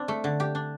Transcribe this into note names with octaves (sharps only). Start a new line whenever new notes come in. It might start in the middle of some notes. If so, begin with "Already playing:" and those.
Already playing: C4 D4
A3
D3
G4
D4